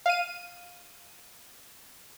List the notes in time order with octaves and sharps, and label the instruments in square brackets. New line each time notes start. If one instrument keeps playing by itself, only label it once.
[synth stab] F5 D#7